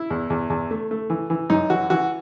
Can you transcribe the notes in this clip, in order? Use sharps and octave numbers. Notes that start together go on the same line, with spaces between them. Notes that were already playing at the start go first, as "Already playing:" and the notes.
Already playing: E4
E2
E2
E2
A3
A3
E3
E3
F#2 D#4
E3 F#4
E3 F#4